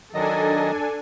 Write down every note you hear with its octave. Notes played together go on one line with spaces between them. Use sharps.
D#3 F#3 D4 A4 D#5 G#5